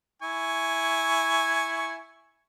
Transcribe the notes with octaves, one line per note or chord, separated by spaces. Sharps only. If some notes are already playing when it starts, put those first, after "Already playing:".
E4 G#5 C#6